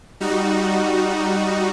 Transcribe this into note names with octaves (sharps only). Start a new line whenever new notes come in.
G3 D#4 F#4